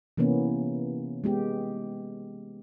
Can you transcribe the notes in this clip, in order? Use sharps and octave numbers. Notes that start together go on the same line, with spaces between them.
C3 E3 A#3 B3 C#4
G#3 B3 G4